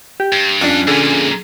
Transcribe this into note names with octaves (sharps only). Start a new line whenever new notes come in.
G4
G2
F2 C#4 D4 F#6
F2 A#2 D3 G#4